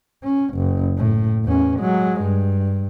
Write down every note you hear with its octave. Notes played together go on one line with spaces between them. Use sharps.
C#4
F#1
A2
E2 C#4
F#3 G#3
G2